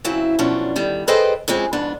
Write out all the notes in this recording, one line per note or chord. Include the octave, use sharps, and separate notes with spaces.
C#3 F#3 C4 E4
F#2 B2 F3 C#4 D4
D3 D#3 G3
G#4 A4 B4 C5 D#5 G5
C#3 F3 G#3 C4
F2 G#2 B3 D4